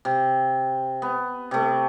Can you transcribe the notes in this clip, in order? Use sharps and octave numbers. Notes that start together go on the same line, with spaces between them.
C3
B3
C3 A3